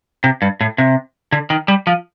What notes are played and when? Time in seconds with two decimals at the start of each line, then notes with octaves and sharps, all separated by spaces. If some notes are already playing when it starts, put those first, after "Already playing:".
0.24 C3
0.42 G2
0.61 A2
0.78 C3
1.32 D3
1.50 D#3
1.68 G3
1.87 F3